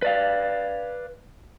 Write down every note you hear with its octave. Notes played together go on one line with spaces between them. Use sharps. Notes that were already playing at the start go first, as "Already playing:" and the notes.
B4 D5 F5